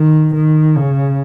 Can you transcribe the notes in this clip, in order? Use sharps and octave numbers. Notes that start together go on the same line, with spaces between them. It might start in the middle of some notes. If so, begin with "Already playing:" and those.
Already playing: D#3
D#3
C#3